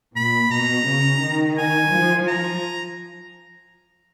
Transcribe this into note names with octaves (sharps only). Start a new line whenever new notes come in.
A#2 B5
B2 A#5
C#3
D#3
G#5
F3
A#5